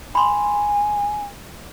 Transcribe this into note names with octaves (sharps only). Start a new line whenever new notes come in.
G#5 B5 C6